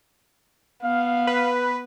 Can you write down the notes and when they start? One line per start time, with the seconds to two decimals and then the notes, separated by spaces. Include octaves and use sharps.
0.83 B3 F5
1.27 B4